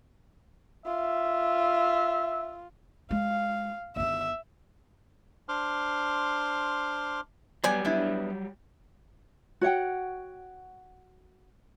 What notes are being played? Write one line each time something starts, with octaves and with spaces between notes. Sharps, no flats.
F4 E5
G#3 F5
G1 D#3 E5
D4 C5 C6 D6 F6
F#3 G3 B3 G4 D5 G#5
B3 D4 E4
F#4 C#5 F#5 G5